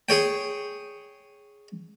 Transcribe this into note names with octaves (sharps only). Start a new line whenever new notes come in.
G#4 C#5 G5